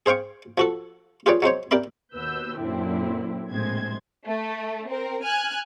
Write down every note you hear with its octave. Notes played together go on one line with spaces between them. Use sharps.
G#4 C5 F5 G5 C#6
F3 F#4 A4
F4 G4 G#4 B4 C#5 D5
F#3 G#3 C5 C#5
G4 A#4 D5 E5 B5
D#2 B2 B4 E6 G6
F#2 A#2 D3 C4 E4
A#1 A2 C3 G#3 C5 G#6
A3
C4 A#4
G#5 F6 F#6 G#6